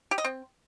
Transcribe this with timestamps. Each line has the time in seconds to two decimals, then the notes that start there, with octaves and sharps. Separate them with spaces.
0.11 G4
0.18 D#5
0.25 C4